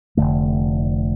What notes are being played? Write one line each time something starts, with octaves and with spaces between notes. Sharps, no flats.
F1 E2 D3 A3